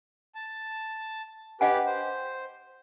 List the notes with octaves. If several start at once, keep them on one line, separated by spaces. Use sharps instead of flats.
A5
G4 B4 D#5 F#5 G#5
C5